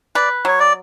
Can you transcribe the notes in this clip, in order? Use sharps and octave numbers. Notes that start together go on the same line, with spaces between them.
B4 D5
F#3 C#5
D5